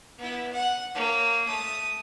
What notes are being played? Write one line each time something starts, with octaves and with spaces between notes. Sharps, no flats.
B3 E4
F#5
A#3 C#5
A3 D#6